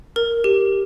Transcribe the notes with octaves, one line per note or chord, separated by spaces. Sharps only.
A#4
G4